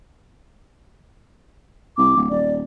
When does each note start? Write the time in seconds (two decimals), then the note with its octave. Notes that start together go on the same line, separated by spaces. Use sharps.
1.97 C2 D6
2.16 D1
2.30 D#1 D5